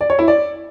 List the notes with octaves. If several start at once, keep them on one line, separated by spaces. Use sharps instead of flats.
D5
C#5
E4
D5